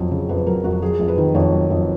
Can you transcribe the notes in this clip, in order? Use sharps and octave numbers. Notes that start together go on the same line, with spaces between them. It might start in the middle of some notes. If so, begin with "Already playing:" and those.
Already playing: F2 F#3 C#5
C#3
F2 B4
F#3 A#4
F2 F#4
F#3 G#4
F2
B4
D#3
F2 C#5
F#3
F2